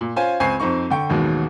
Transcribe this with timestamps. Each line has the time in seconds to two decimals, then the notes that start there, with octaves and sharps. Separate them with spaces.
0.01 A#2
0.16 C#4 F4 C5 F5 G#5
0.40 C#2 C4 G#5 C#6 C7
0.60 F2 C4 D#4 C#6
0.90 D3 G5 C#6
1.10 A1 D#2 B2 D#3 F#3 G#3